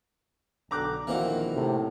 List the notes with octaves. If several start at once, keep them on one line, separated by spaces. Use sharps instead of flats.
B1 D3 A#5 D6 F#6
A#1 A#2 D#3 E3 A#3 C4 F#4
A2 C3